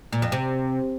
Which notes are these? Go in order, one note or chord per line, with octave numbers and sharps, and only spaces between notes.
A#2
F2
C3